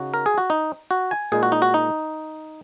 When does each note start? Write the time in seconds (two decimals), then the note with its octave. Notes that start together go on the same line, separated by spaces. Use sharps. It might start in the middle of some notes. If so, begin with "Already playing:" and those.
Already playing: C#3 D#4 F#4
0.14 A#4
0.26 G#4
0.38 F#4
0.50 D#4
0.91 F#4
1.11 G#5
1.32 A#2 G#3 D#4 G#4
1.43 F#4
1.52 D#4
1.62 F#4
1.74 D#4